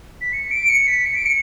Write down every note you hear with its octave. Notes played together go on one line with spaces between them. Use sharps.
B6
C#7
D7
C#7
B6
C#7
D7
C#7